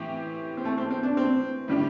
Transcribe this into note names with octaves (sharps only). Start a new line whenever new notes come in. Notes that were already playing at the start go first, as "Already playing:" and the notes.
Already playing: A2 E3 C4 G4
C4
A3
C4
C4
D4
C4
A2 G3 D4 G4